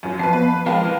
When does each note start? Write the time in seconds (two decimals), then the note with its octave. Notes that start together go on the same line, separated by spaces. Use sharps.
0.03 F#2 F#3
0.19 F2 B4 A5 C7
0.33 B3 B4
0.47 B5
0.66 F3 G#3 A#4 F5 G5 A5
0.84 E3 B4